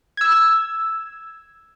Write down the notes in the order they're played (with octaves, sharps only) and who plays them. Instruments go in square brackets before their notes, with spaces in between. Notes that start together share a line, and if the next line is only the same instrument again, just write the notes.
[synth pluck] E6 G#6